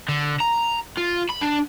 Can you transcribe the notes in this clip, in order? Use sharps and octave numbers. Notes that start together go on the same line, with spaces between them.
D3
A#5
F4
B5
D4